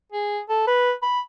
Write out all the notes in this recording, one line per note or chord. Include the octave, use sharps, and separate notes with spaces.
G#4
A4
B4
B5